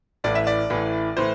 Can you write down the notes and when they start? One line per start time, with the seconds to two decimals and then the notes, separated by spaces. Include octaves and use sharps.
0.24 A1 A2 E3 D5
0.35 E5
0.47 D5
0.70 A1 A2 E3
1.17 A2 E3 C5